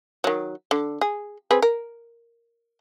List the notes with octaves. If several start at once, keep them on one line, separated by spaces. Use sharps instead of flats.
D#3 F#3
D3
G#4
C4 G#4 B4
A#4